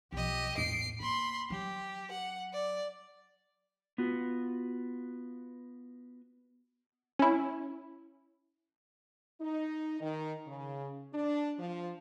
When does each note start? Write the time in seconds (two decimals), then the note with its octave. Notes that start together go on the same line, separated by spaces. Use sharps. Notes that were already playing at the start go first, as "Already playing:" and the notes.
0.12 B1 F3 G4 D#5
0.58 E2 A2 C7 D7
1.00 A#3 B5 C6
1.50 F#3 G4
2.12 F#5
2.53 D5
3.98 B3 F4 F#4
7.19 C#4 E4
9.41 D#4
10.01 D#3
10.46 C#3
11.14 D4
11.59 F3